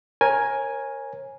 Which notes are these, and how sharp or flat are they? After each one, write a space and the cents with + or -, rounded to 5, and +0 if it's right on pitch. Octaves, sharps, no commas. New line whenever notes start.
A#4 +10 C#5 -30 G#5 +0